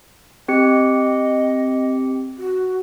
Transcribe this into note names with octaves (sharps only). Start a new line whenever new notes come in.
C4 G4 D#5 C#7
F#4